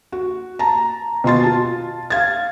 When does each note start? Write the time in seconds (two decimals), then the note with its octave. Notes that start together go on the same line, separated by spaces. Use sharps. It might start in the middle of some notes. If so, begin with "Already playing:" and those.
0.12 F#4
0.59 A5 A#5
1.24 B2 F4 C6 A6
1.44 F4 A5
2.10 F5 G#6 A6